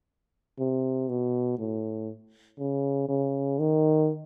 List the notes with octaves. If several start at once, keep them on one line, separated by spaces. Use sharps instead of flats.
C3
B2
A2
C#3
C#3
D#3